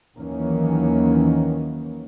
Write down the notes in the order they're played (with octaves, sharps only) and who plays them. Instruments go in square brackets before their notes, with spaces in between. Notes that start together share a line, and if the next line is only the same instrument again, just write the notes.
[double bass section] D#2 D#3 E3 F#3 A#3 C#4